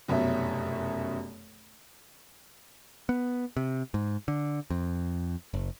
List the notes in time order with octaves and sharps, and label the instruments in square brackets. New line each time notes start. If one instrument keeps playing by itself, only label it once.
[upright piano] F1 F#2 B2 C#4 E5
[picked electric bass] B3
C3
G#2
D3
F2
F#1